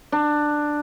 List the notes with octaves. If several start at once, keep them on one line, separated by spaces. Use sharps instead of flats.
D4